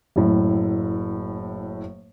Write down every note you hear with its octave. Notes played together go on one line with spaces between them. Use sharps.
F#1 A2